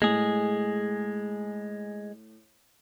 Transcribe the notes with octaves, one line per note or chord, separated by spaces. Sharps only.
A2 G#3 G#4